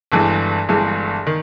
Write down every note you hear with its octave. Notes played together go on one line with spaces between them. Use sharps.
G1 G2 E3 G#3
G1 G2 E3 G#3
D#3